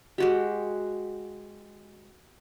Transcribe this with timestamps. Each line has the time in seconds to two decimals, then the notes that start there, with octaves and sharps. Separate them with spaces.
0.18 G#3 F#4 G4